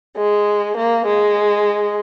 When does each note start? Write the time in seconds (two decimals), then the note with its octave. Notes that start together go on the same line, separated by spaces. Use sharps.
0.17 G#3
0.76 A#3
1.05 G#3